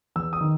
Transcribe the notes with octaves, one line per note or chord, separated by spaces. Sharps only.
E2 E6
D#6
D#3